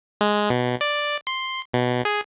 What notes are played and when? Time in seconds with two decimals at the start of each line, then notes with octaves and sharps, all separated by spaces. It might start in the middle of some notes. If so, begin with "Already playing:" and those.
0.21 G#3
0.50 B2
0.81 D5
1.27 C6
1.74 B2
2.05 G#4